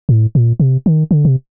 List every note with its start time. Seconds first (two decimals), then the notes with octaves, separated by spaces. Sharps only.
0.09 A2
0.35 A#2
0.60 C3
0.86 D#3
1.11 D3
1.25 C3